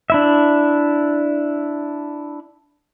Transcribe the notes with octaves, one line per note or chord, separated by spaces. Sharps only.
D4 E4 E5